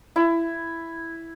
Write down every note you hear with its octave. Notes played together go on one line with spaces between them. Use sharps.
E4